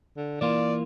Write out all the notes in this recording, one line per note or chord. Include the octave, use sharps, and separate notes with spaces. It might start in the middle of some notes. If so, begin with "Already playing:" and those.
D3
E3 A#3 F4 D5